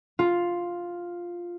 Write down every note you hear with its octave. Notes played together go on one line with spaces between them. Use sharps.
F4